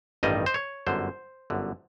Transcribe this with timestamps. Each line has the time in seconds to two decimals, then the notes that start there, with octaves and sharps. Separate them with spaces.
0.23 A1 G2 D#3 G3 D#5
0.46 C5
0.54 C#5
0.87 G1 F#2 D3 C5
1.50 G1 F#2 D3